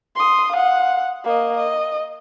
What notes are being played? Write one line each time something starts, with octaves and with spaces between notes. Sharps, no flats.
C6 D#6
F5 F#5
A#3 D#5
D#5